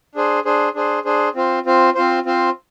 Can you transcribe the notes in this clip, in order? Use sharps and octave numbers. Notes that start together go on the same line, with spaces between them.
D4 G#4 C5
D4 G#4 C5
D4 G#4 C5
D4 G#4 C5
C4 F4 C5
C4 F4 C5
C4 F4 C5
C4 F4 C5